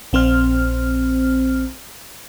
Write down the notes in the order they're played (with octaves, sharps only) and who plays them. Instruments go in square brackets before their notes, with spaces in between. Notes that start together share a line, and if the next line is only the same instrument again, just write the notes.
[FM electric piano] A#1 C4 C5 F6